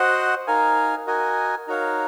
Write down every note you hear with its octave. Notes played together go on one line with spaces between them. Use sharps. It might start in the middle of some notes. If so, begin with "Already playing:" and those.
Already playing: F#4 C5 D#5 F#5
D#4 A#4 F5 G#5
F#4 A#4 D#5 G#5
D#4 F#4 A#4 C#5 F5